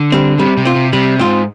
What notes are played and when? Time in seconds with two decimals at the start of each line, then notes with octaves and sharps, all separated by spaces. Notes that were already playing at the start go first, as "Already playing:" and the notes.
Already playing: D3
0.12 G3 C4
0.39 C3 G3
0.57 C3
0.65 C4 F4
0.75 C3
0.93 C3 G3
1.19 G#2 C4 F4